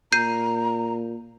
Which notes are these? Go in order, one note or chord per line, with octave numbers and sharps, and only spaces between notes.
A#2 A#5 G6 C7 D#7